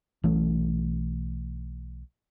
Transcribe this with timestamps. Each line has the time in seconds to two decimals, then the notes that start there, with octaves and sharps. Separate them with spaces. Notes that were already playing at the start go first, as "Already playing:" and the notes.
0.24 B1 E3 A3 C#4